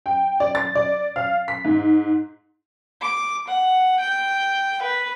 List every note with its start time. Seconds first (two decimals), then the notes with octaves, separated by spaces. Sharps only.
0.06 G5
0.40 D5
0.55 A6
0.75 D5
1.16 F5
1.48 B6
1.65 G#2
3.02 D6
3.48 F#5
4.00 G5
4.83 B4